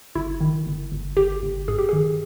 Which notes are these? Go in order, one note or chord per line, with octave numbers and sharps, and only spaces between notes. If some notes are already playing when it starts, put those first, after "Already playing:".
G1 E4
D#3
G1
G1
G1 G4
G1
G2 G#4
G4
D#3 G#4